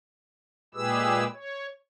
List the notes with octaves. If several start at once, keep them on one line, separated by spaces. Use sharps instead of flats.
A#2 G#3 G4 G#4 B4 E6
C#5